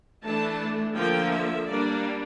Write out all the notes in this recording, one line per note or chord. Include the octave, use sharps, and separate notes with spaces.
E3 A3 D4 A5
D3 F3 A#3 G5
E5
G3 A#3 D4 D5